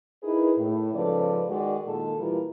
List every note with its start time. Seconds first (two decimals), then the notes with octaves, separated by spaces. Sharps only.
0.23 D#4 E4 G#4 A#4 B4
0.58 A2
0.94 G#2 C#3 F3 A4 B4 D5
1.48 D#3 G#3 F#4 D5
1.85 A#2 D#3 G#3 A4
2.19 A#2 E3 G3 F4 A#4